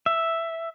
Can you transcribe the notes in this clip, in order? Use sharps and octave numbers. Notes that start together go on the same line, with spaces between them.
E5